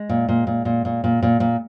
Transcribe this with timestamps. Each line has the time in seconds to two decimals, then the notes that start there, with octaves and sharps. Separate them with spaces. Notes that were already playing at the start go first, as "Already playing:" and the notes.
Already playing: G#3
0.09 A#2
0.29 A#2
0.47 A#2
0.65 A#2
0.85 A#2
1.04 A#2
1.23 A#2
1.40 A#2